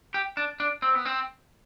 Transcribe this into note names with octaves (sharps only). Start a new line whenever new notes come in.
G4
D4
D4
C4
B3
C4